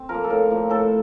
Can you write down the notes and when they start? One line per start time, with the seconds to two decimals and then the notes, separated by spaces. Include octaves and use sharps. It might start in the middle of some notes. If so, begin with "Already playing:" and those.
Already playing: C4
0.09 F3 A#4
0.14 A#3
0.24 A4
0.29 A2 A#4
0.50 F3 A#3
0.70 A2 A4